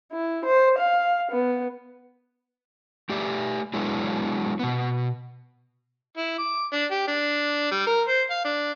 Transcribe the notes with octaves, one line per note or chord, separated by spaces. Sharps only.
E4
C5
F5
B3
A3 G4 D5 E5
F#3 G#3 B3 D4 E4
B2 B3
E4
D6
D4
G4
D4
G3
A#4
C5
F5
D4